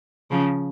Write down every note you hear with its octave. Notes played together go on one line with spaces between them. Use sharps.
C#3 F3